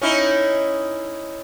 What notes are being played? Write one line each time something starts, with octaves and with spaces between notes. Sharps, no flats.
C#4 D#4 E4